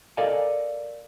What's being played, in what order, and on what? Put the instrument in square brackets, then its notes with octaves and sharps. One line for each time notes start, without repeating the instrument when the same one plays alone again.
[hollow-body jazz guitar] A4 A#4 D5 D#5 F5 G#5